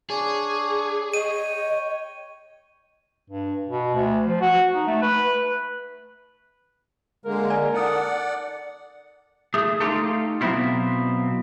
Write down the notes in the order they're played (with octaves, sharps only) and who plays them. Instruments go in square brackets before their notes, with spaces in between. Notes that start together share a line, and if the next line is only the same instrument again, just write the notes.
[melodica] D4 C#5 [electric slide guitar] G#4
[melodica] C#5 G5 [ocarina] D#5 [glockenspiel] D#7
[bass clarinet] G2
B2
D2
F3
F#4
D#4
A3
B4
[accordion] D3 G#3 A#3 [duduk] A#4
[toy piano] D5 G#5
[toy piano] D#4 A4 [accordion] D5 F#5
[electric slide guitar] A3 G#4
A3 D#4 F4 G4 A4
B2 F#3 B3 C4 E4 F4